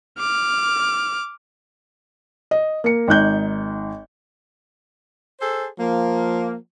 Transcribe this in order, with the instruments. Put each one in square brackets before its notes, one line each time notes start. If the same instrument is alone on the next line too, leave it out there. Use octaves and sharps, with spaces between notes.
[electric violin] D6 F6
[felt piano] D#5
A#3 C#7
G#1 D#4 F#6 G6
[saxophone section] G#4 A4 C5
[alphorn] F3 [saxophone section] A#3